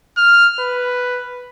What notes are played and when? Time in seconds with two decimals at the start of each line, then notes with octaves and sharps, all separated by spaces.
0.17 F6
0.60 B4